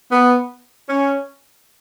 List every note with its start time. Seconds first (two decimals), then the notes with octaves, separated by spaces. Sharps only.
0.11 B3
0.89 C#4